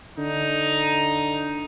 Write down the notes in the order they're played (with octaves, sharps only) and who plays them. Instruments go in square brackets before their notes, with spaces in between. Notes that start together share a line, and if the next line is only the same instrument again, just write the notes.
[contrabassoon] D3 [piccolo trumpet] D#4